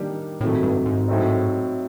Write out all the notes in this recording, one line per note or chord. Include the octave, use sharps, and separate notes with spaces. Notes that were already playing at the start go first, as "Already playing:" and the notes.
Already playing: D#3 G3 A#3 D4
A2 C3 D#3 F#3 A3
G2
G#2
A2 F#3 A3 C4 D#4